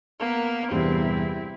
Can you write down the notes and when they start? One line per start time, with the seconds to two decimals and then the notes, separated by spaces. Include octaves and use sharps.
0.19 A#3 B3 A#4
0.71 E2 G2 C3 C4 E4